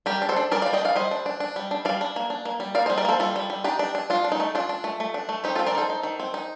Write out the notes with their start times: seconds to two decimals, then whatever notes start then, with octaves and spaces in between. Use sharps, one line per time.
0.06 G3 G4 A#4
0.22 D4
0.29 A4 C5
0.36 D4
0.51 G3 A#4 D5
0.62 D5 F5
0.66 G3
0.73 D#5 G5
0.81 D4
0.85 D5 F5
0.95 G3 C5 D#5
1.11 D4
1.26 D4
1.40 D4
1.56 G3
1.71 D4
1.85 G3 D5 F5
2.01 D4
2.16 A#3
2.30 D4
2.45 A#3
2.60 G3
2.75 A#3 D5 F5
2.86 G3 C5 D#5
2.98 A#4 D5
3.05 A#3 A4 C5
3.20 G3 F4 A4
3.36 G3
3.50 G3
3.64 D4 D#4 G4
3.79 D4
3.95 D4
4.10 D4 F4
4.24 D4
4.32 D#4
4.40 A3
4.55 D4 F4
4.69 D4
4.84 A3
5.00 A3
5.14 D4
5.29 A3
5.44 C4 D#4 G4
5.55 F4 A4
5.59 C4
5.66 A#4 D5
5.75 D#4 A4 C5
5.90 D#4
6.03 D#3
6.20 C4
6.34 D#4